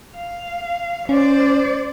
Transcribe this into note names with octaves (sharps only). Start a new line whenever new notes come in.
F5
C#4 C5 D5